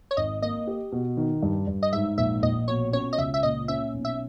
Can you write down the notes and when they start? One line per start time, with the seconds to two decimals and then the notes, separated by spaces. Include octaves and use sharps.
0.11 C#5
0.17 G#1 D#5
0.42 A#3 D#5
0.67 G4
0.92 B2
1.17 D#3
1.43 G2
1.68 G2
1.83 D#5
1.93 G#2 E5
2.18 A#1 E5
2.43 A#1 D#5
2.68 B2 C#5
2.93 C#4 C#5
3.13 D#5
3.18 C#2 E5
3.34 E5
3.43 A#2 D#5
3.68 C#4 E5
3.94 B1
4.05 E5